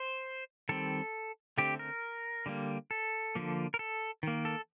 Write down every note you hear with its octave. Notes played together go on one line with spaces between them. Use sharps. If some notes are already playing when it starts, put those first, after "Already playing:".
Already playing: C5
D#3 G3 C4 A4
D3 A3 C4 G4
A#4
D3 G3 A#3
A4
D3 F3 A#3
A#4
A4
D#3 A#3
A4